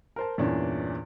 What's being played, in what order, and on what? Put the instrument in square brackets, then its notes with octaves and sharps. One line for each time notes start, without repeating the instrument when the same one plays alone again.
[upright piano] A#4 C5 A5
E2 G2 A#2 E3 C#4 D4